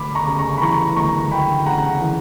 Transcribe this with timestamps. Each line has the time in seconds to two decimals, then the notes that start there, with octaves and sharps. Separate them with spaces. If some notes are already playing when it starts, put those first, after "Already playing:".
Already playing: D2 B5 D6
0.15 A#5 C#6
0.27 C#3
0.39 A#5 C#6
0.58 B5
0.61 E3 A#5 C#6
0.97 D2 A#5 C#6
1.31 D2 G5 B5
1.66 C#3 F#5 A#5
2.01 E3